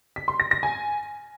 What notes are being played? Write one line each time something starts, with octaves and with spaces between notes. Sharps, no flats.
B6
C6
A#6
A#6
G#5